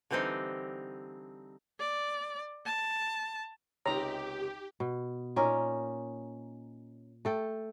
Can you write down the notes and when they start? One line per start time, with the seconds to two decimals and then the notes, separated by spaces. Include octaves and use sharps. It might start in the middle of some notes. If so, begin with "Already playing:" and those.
0.11 D3 E3 G3 C4 D#4
1.79 D5
2.65 A5
3.86 C#2 C3 D#4 G4 C#5 A#5
4.80 B2
5.36 A#2 C#4 D#4 A#4
7.25 A3 A4 G5